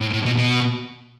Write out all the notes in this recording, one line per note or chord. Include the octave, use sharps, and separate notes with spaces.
A2
A2
B2
B2